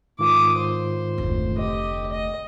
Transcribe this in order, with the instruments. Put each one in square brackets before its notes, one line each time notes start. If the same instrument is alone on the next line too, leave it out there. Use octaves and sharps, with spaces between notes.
[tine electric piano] G#2 D#3 F4 [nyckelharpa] D6 D#6
[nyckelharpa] C5
[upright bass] F1 D2
[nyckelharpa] G4 D#5
D#5